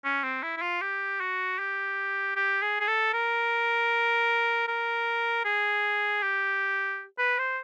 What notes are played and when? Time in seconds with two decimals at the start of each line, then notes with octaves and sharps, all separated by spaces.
0.05 C#4
0.24 C4
0.43 E4
0.57 E4
0.62 F4
0.82 G4
1.20 F#4
1.59 G4
2.36 G4
2.62 G#4
2.80 G#4
2.88 A4
3.13 A#4
4.68 A#4
5.45 G#4
6.22 G4
7.19 B4
7.38 C5